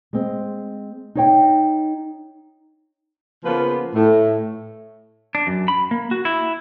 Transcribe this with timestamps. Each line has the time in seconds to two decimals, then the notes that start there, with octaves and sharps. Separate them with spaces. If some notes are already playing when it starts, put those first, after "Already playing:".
0.13 G#3 C4
1.15 D#4 C#5 G5
3.45 C#3 F3 A#3 B3 F4 B4
3.95 A2 A3
5.35 D4
5.47 F#2
5.68 B5
5.91 A#3
6.11 F#4
6.25 E4